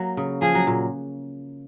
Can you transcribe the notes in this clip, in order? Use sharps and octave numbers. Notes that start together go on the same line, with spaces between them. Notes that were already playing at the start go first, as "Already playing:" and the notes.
Already playing: F#3 A#3
C#3
F3 G#4
F#3
A#2